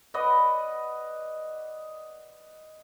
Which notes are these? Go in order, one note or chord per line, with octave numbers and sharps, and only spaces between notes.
B4 D5 D#5 F#5